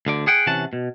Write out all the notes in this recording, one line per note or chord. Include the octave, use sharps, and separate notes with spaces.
D2 D3 D5
G#4 F#5 G5
C3 E3 C#4 F#5 A5
B2